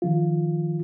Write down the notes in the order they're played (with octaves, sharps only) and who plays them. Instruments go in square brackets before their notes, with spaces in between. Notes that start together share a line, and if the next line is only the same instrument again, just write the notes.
[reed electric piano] D#3 F3 F4